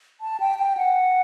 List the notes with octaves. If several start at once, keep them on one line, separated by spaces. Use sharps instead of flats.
A5
G5
G5
F#5